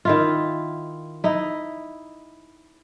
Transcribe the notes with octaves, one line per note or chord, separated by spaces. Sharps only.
D#3 E4 F4
D#4 E4